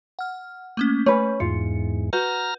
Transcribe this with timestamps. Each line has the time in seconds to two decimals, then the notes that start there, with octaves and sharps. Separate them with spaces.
0.19 F#5 F6
0.77 A3 A#3 C#4
1.06 A3 C#4 B4 C#5
1.40 E2 G#2 F4 C#7
2.13 F#4 B4 A#5 F6 G6